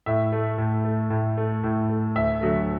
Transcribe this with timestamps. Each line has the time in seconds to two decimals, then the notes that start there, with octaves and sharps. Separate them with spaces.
0.06 A2 E5
0.32 A3
0.58 A2
0.85 A3
1.10 A2
1.37 A3
1.64 A2
1.89 A3
2.15 D2 E5
2.41 D3 F#3 A3